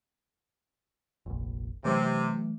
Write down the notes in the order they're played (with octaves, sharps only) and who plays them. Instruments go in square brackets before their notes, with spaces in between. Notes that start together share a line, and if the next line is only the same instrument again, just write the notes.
[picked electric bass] F1 A#1
[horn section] C3 [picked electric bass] E3 F#3 A3